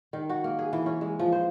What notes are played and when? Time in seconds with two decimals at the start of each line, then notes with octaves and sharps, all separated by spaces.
0.13 D#3
0.29 F#4
0.44 A#3
0.59 G#4
0.73 E3
0.86 C#4
1.01 G#3
1.19 F3
1.32 C5